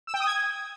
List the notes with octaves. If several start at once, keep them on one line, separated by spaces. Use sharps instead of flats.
E6
G5
D#6
G#6